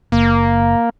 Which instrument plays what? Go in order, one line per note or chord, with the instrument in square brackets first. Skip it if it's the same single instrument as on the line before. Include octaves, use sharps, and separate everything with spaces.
[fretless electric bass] F#1 [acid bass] A#3